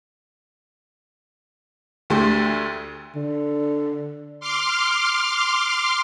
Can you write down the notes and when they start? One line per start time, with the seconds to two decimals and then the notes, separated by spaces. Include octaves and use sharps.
2.10 D2 D3 A3 G4 C6
3.15 D3
4.40 C6 D6 F6